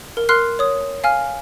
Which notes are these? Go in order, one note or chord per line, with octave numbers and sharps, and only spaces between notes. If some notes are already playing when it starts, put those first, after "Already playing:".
A#4
A#4 C6 F6 F#6 C7
C#5 D#6
F5 G#5 F6